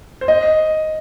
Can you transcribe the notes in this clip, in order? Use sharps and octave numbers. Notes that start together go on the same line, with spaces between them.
C5
D#5